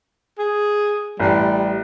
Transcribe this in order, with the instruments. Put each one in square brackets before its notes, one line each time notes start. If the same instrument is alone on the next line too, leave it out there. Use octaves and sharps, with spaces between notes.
[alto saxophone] G#4
[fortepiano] A1 [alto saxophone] G3